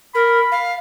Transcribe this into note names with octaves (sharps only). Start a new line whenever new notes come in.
A#4 B5
F5